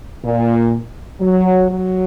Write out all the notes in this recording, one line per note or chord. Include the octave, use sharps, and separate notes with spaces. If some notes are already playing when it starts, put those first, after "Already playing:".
A#2
F#3
F#3